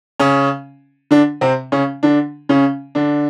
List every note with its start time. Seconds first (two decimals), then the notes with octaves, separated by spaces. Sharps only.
0.19 C#3 C#4
1.11 D3 D4
1.41 C3 C4
1.72 C#3 C#4
2.03 D3 D4
2.49 C#3 C#4
2.95 D3 D4